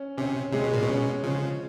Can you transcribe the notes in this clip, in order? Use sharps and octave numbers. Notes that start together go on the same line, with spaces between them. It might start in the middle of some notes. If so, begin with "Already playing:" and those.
Already playing: C#4
C3 C#4
C3 G#3
B2
A#2
B2
C#4
C#3 F3